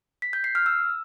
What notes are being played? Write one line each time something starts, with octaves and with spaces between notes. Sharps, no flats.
B6
G6
C7
F6
E6